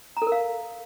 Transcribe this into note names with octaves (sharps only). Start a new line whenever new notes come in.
A#5
A4
A#4
F5